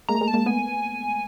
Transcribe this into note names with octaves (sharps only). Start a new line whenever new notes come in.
G#3 A#3 A#5
A3
G#3 A#3
A5
G#3 A#3
A3 B3 G#5